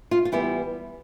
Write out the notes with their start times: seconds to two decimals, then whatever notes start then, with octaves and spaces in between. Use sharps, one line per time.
0.11 F4
0.25 F4
0.32 E3 G3 B3 E4